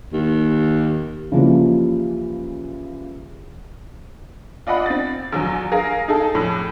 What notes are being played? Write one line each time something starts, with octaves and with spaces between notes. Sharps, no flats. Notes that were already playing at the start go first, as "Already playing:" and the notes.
D#2
C#3 E3 F3 G3 A#3
F4 D5 D#5 F#5 B5
C4 A6
A#1 E2 F#3
G#4 A#4 F5
D#4 G#4 A4
F2 A2